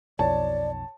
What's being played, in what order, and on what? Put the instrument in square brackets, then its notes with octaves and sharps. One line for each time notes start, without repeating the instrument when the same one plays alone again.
[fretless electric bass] B1 F2 [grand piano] C#5 A5 [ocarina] D5